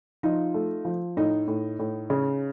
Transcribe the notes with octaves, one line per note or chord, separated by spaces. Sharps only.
F3 D#4 F4
A3
F3
A2 D#4
A2
A2
C#3